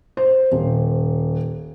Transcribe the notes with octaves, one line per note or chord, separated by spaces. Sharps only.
C5
D#1